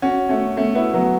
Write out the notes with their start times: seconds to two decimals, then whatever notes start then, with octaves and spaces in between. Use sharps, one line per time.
0.02 C#4 F#4
0.29 A3 C#4
0.57 A3 C#4
0.75 B3 E4
0.93 F#3 B3